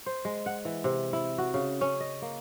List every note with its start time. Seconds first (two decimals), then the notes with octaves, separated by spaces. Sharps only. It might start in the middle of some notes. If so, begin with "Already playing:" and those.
0.06 C5
0.25 G#3
0.46 F#5
0.65 E3
0.84 C3
1.13 E4
1.38 F#4
1.54 C#3
1.81 C#4
2.00 D#5
2.22 A#3